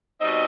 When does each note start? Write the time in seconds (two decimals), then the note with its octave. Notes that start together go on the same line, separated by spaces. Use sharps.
0.20 B2 G3 C4 D#4 D#5